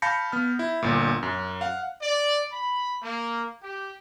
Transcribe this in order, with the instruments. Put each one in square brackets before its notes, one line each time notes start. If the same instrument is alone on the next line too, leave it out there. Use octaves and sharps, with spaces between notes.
[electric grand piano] F5 A5 B5 G6 A#6 C#7
B3 F6
E4
G1 A#2
F#2
F5 F#5
[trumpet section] D5
B5
A#3
G4